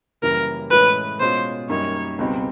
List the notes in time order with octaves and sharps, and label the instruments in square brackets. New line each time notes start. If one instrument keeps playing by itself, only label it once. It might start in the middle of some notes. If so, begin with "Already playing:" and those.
[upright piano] F#2 C#3 E3 G3 A#3 [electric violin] A#4
[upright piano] A2 E3 G#3 C#4 [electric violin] B4
[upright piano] B2 G#3 C#4 F4 [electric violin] C5
[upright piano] F#2 D#3 G3 A#3 D#4 [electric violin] C#5
[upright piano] C#2 B2 G3 C4 D#4